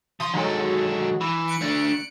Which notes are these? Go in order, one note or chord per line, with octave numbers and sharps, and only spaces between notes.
F3 C6 D#6
D#3 F#3 G#3 A4
E3
F#6 C#7 D7
A3 D4